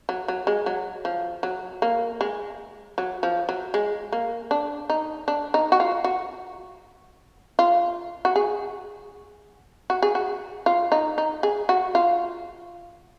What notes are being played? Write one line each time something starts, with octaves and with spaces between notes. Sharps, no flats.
F#3
F#3
G#3
F#3
F3
F#3
A#3
G#3
F#3
F3
F#3
G#3
A#3
D4
D#4
D4
D#4
F#4
F4
F#4
F4
F#4
G#4
F#4
G#4
F#4
F4
D#4
D#4
G#4
F#4
F4